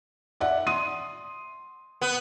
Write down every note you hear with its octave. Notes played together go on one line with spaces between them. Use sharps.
D5 E5 F#5
C6 D#6 D#7
B3